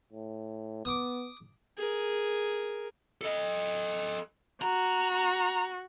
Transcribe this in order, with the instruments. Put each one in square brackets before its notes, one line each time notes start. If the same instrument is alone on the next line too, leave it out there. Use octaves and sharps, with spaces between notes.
[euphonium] A2
[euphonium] B3 [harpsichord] D6 D#6
[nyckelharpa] G#4 A#4
[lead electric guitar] A4 D#5
[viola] F#4 [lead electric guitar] A#5